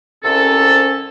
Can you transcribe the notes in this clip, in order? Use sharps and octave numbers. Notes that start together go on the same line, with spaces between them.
C2 C3 C#4 A4